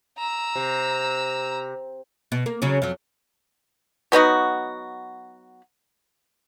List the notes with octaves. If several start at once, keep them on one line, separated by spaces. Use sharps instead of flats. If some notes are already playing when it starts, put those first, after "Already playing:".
A#5 E6
C3
B2
A#3
C#3 F#3 C#4
F2 F#3
F#3 B3 D#4 F#4